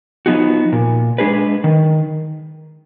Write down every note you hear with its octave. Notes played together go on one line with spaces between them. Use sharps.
F3 B3 D#4 F#4
A#2
G#3 D4 G#4 B4
D#3